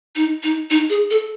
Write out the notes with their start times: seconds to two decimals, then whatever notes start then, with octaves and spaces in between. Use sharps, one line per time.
0.16 D#4
0.43 D#4
0.71 D#4
0.90 G#4
1.11 A4